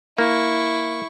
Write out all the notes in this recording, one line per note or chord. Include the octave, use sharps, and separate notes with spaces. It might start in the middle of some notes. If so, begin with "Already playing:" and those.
A#3 E4 C#6